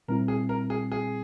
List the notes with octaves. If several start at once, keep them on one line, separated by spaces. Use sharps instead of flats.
A#2 G3 C4 E4 A#4
G#4
A#4
G#4
G#4